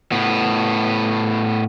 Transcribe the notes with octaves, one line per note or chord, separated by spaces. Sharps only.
A2 B3